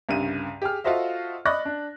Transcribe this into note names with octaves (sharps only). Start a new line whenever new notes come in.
C2 G2 C#3 D#7
G4 G#4 F6
F4 F#4 A4 C5 D#5 E5
D5 D#5 B5 C#6 F#6 A#6
D4